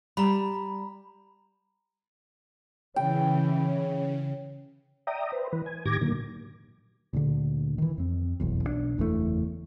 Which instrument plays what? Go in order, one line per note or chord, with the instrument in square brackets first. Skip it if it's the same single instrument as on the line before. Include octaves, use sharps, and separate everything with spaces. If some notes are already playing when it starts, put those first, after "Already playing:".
[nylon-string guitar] G3 [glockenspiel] A#5 B5
[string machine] C#3 [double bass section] E3 [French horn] C#5 [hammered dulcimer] G5
[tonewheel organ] D5 E5 G5 A#5 D#6
B4 C5
E3 B4
G#5
A2 D#3 G4 D6 G#6 A#6
A#2 D3 D#3 F#3 A#3
[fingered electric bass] D2 A#2 D3
D#3 E3
F2 C4
F1 B1 E2
B1 F3 D4
F#1 E2 E3 A3